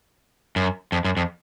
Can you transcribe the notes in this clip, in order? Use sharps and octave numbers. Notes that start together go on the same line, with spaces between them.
F#2
F2
F#2
F2